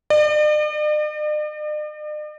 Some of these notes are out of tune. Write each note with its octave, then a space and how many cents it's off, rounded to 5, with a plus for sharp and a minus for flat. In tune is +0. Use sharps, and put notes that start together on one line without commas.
D5 +45